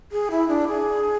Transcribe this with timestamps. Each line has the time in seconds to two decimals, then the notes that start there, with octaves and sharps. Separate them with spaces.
0.12 G#4
0.31 E4
0.48 D4
0.68 G#4